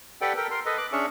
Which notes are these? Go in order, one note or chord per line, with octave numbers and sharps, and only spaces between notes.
G4 A4 B4 D5 F#5 G5
A4 A#4 G5
A#4 C6
A4 B4 D#5
D6 F#6
C#4 D4 G#4 C#5 E5